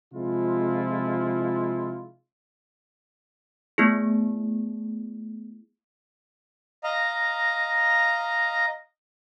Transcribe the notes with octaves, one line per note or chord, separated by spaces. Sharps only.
C3 F3 G#3 E4 F4
A3 B3 E4 G#4
D#5 F5 A#5